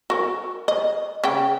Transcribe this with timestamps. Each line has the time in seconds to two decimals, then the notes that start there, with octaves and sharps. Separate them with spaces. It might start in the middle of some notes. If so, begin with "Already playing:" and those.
0.10 F#4 A#4
0.68 D#5
1.24 C#3 G5